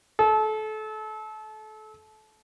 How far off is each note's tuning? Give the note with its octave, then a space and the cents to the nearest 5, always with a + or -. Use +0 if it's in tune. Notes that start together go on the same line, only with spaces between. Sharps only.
A4 -30